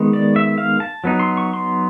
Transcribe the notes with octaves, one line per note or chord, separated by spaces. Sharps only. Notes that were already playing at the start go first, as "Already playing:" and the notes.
Already playing: D#3 G#3 B3
D5
E5
F5
A5
F#3 B3 D#4
C6
C#6
C6